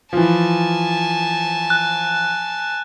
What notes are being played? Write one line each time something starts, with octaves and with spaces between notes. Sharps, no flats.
E3 F3 G#5 A5
F#6